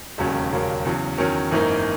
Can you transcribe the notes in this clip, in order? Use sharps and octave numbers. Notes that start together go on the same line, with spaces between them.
E1 D#2 C#3 F#3 C#4
E1 D#2 C#3 F#3 A#3
E2 C#3 F#3
E2 D#3 F#3 C#4
G#1 F#2 E3 A#3 D#4